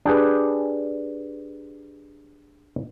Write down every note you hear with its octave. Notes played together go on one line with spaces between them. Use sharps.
D4 G4 G#4 B4